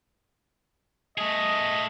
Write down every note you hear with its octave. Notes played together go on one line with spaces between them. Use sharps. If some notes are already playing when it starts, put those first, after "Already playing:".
A3 G#4 D#5